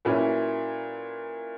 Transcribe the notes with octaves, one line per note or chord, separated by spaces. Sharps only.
A#2 F#3 C#4 E4 B4